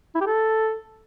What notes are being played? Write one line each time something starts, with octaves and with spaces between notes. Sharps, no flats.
E4
G4
A4